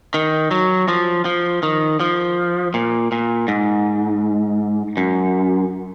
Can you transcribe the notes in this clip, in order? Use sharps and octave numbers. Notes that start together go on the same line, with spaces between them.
D#3
F#3
F3
F3
D#3
F3
A#2
A#2
G#2
F#2